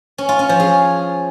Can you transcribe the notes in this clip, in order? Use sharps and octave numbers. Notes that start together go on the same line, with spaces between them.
C#4
F4
C#4
F3
G#4